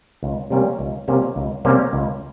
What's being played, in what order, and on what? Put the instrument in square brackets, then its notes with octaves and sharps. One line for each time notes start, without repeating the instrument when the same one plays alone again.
[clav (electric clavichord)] C#2
C3 G3 A#3 C#4
C#2
C3 G3 A#3 C#4
C#2
C3 G3 A#3 C#4
C#2